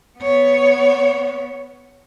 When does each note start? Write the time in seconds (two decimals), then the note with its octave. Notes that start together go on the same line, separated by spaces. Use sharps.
0.19 B3 C#5